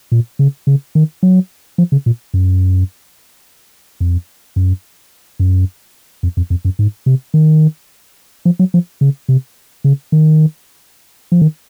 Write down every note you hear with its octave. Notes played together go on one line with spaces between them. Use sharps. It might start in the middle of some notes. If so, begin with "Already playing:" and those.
A#2
C#3
C#3
D#3
F#3
F3
C#3
A#2
F#2
F2
F#2
F#2
F2
F2
F2
F#2
G#2
C3
D#3
F3
F#3
F3
C#3
C3
C#3
D#3
F3
D#3